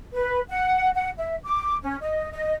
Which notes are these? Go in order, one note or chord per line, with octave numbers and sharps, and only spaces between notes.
B4
F#5
F#5
E5
D6
C#4
D#5
D#5